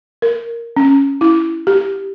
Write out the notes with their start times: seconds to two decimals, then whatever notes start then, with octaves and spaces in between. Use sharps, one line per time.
0.22 A#4
0.77 C#4
1.21 E4
1.67 G4